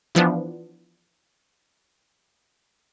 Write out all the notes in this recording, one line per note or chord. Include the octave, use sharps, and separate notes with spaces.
E3 F3 B3 D4